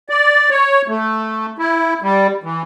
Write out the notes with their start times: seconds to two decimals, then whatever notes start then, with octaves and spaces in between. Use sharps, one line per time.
0.09 D5
0.50 C#5
0.88 A3
1.59 E4
2.02 G3
2.43 E3